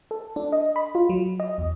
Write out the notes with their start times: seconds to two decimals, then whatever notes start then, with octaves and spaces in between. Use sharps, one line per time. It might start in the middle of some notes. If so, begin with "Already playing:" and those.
0.11 A4
0.36 D4
0.52 D#5
0.76 B5
0.95 F4
1.09 F#3
1.40 D#5
1.58 E2